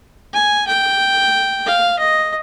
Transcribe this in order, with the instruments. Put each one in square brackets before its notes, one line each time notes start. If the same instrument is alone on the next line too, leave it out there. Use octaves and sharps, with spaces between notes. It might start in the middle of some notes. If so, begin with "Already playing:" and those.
[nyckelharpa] G#5
G5
F5
D#5